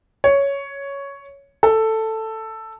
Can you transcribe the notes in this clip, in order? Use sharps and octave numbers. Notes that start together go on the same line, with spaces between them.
C#5
A4